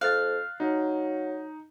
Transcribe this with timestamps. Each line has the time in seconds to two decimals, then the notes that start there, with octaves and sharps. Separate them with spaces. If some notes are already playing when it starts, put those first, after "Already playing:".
0.01 F2 F5 F#6 A6
0.60 F#3 D#4